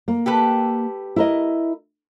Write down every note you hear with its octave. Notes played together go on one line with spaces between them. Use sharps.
A#3
G4 A4 B4
E4 A#4 D#5